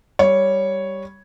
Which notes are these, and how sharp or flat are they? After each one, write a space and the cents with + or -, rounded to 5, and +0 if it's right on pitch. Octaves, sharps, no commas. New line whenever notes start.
G3 +0 C#5 +0